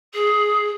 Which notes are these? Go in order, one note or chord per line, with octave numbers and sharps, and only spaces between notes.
G#4